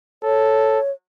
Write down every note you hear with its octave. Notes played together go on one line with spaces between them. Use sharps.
A4 C#5